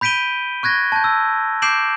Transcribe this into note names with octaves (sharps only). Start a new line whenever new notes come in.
B5 G6 B6 D7 D#7 G7
C#6 F#6 G#6 A#6
A5 G6
E6
D6 G6 C7 D7 E7 F#7